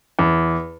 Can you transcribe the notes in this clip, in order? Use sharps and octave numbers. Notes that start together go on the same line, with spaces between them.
E2